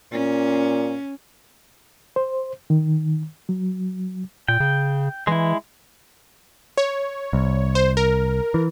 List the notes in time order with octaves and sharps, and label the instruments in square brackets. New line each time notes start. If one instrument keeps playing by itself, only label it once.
[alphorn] A#2 [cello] C#4
[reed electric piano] C5
D#3
F#3
[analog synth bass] A#2 [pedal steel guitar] G5
[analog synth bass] C#3
[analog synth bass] E3 [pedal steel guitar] G#3 E4
[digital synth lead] C#5
[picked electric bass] C2
[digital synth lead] C5
A#4
[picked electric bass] E3